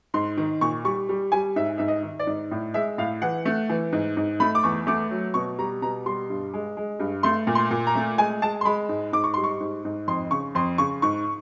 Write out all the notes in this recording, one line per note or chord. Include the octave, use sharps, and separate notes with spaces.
G#2 C6
D#3
A#2 C#6
G3 C#6
G3
G3 G#5
G#2 E5
G#2 E5
D#5
D#3
D5
G#2
A2
G#3 E5
A2 F5
E3 F#5
A3
E3
G#2
G#2
A3 B5
D6
E2 C#6
A3 D6
F#3
B2 C#6
G3 A#5
B2 A#5
G3 C6
G2
G#3
G#3
G2
A3 C6
A#2
C6
A#2
A#5
A3
G#3 G#5
G#3 A5
C6
G#3 B5
G#2
G#2 D6
C#6
G3 C6
C#6
G#2
G#2
F2 C6
C#3 C#6
F2 C6
C#3 C#6
G#2 C#6